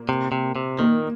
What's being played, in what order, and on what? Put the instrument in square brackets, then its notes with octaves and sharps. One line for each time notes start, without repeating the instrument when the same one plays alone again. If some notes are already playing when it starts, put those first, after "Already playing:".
Already playing: [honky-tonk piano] A#2 A#3
[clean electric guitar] C3
C3
C3
[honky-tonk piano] A#2 A#3 [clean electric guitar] D#3